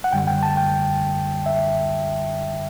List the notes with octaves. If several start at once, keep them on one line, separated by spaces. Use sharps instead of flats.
F#5
F#2 D3 G3 G5
G5
A5
G5
E5